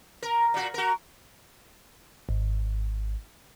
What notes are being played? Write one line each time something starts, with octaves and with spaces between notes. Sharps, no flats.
A#4
A#2 F#4
F#4 A#4
G#1